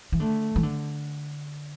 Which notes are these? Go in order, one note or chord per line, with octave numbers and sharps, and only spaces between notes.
E3
D3 A3
E3
D3